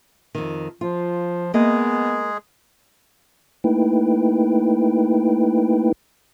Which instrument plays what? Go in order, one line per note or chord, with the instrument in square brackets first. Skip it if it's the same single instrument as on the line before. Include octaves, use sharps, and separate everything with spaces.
[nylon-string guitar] F2 D#3
[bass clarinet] F3 [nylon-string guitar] F4
[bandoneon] G#3 G#4 [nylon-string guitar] A#3 D#5 [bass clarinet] B3
[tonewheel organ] A3 A#3 D#4 E4 B4 G5